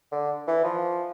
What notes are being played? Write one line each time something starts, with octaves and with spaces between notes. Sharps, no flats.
D3
E3
F3